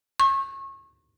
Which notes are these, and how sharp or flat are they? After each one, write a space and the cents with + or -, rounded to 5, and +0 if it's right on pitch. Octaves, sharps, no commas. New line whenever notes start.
C#6 -30